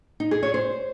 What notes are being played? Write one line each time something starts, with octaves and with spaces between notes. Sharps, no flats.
D#4
G#4
C#5
C5